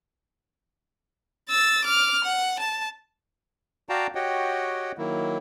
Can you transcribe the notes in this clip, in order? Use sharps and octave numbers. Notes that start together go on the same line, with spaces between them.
E6 A6
D6 F6
F#5
A5
F#4 D5 F5 G5 A5 A#5
F#4 G4 C#5 D#5 F#5 G5
D#3 F#3 A#3 E4